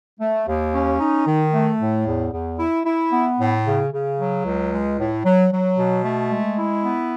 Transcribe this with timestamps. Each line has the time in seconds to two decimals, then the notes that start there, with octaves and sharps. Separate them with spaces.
0.20 A3
0.47 D#2
0.74 C#4
1.00 D#4
1.27 D#3
1.53 A3
1.79 A2
2.06 E2
2.32 E2
2.59 E4
2.85 E4
3.12 B3
3.39 A2
3.66 C#3
3.92 C#3
4.18 F#3
4.45 C#2
4.72 G#3
4.98 A2
5.24 F#3
5.51 F#3
5.78 B2
6.04 A3
6.31 G#3
6.58 E4
6.84 B3